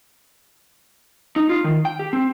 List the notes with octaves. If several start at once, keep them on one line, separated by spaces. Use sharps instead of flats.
D#4
F4
D#3
G5
G4
C4